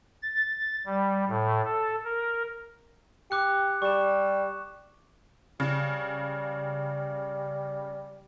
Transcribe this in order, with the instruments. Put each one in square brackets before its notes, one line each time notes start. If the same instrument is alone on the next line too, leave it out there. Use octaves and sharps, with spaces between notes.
[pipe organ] A6
G3
A2
A4
A#4
[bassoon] G4 [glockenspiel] D6 F#6 C#7
[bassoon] G3 [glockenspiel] C#6 E7
[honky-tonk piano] C#3 [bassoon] G3